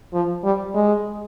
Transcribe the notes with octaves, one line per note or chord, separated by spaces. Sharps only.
F3
G3
G#3